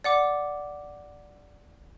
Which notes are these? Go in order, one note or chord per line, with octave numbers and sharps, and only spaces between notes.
D5 F#5 D6